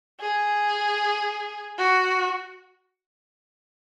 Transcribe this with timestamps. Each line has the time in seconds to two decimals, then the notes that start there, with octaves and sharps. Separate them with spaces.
0.20 G#4
1.79 F#4